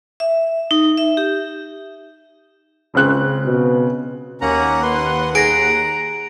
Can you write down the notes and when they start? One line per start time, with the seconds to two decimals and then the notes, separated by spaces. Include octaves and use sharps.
0.20 E5
0.71 D#4
0.97 E5
1.17 G4
2.95 C#2 C#3 C4 F#6
3.45 B2
4.41 D#2 A#3 C#4 F#5 A#5
4.82 B4 C6
5.35 G#4 A#5 A#6 D7